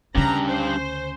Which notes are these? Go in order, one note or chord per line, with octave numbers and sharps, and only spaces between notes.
D2 G2 C#3 C#4 A#5
C5